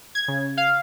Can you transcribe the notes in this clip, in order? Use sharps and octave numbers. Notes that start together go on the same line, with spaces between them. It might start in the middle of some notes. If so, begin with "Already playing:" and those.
G#6
C#3
F5